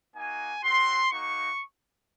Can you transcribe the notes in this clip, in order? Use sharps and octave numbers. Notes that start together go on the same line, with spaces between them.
A#3 D#4 F#4 G#5
C4 F#4 C6
A#3 D#4 F#4 C#6